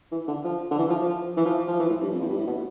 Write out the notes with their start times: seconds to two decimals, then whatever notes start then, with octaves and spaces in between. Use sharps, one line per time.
0.12 E3
0.28 D3
0.45 F3
0.71 D3
0.79 E3
0.90 F3
1.01 F3
1.37 E3
1.46 F3
1.68 F3
1.80 E3
1.90 A2
2.01 G2
2.13 F2
2.22 E2
2.29 G2
2.38 A2
2.47 B2